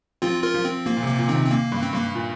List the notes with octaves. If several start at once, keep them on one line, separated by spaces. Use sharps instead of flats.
F3 C4 F4
F4 A#4
F3
C4
F3 A#3
A#2
C3
A#3
A#2
D#3 C4
C3
C4
A#3
G2
C4
G2 A#3
A#2